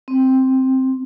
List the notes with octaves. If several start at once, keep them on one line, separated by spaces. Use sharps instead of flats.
C4